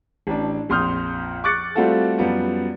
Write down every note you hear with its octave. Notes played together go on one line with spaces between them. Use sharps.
A1 D4
A#1 F2 C6 D#6 F6 G6
C#6 D6 F#6 A6 C#7
G3 A3 C4 F4 F#4 A4
F#2 F3 G3 B3